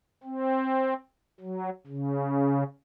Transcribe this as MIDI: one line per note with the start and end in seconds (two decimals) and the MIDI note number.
0.24 0.94 60
1.40 1.69 54
1.87 2.63 49